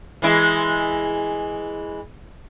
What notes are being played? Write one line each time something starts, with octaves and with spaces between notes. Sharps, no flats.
E3 G#3 E4